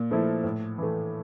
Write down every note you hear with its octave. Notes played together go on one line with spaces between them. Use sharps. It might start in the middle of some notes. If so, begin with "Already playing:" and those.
Already playing: A#2
F3 A3 E4
A2
E3 A3